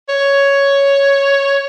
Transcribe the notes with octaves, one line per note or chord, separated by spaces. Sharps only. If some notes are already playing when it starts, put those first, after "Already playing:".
C#5